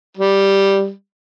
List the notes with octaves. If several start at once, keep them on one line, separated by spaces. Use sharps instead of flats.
G3